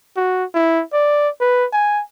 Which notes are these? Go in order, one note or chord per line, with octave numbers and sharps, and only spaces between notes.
F#4
E4
D5
B4
G#5